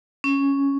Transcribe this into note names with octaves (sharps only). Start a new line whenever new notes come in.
C#4